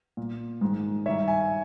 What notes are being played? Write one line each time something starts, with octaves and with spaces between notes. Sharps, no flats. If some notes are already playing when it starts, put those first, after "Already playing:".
A#2
G#2 D#3
G2 D#3 C#5 E5
E5 G#5